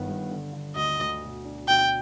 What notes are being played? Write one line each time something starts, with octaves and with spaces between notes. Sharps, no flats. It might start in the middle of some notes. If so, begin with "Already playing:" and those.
Already playing: G1 D#3 B3
G2
D3
D3
D2 D#5
D2
B2
D4
B2 G5